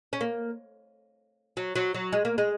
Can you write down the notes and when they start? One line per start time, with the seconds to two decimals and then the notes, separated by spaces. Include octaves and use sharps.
0.13 C#4
0.21 A#3
1.57 F#3
1.76 F#3
1.94 F#3
2.12 G#3
2.25 A#3
2.38 G#3